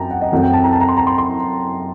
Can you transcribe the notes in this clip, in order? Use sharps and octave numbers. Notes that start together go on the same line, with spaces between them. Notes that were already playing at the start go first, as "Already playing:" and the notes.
Already playing: F#2 C4 G5 A5 A#5
F#5
D#5
F#2 F#3 A3 C4 F#5
G5
A5
A#5
A5
A#5
C6
A#5
C6
C6